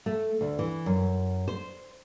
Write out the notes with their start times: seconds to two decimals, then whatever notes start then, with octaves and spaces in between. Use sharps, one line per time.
0.06 A3
0.41 D2
0.59 E3
0.86 F#2
1.48 C5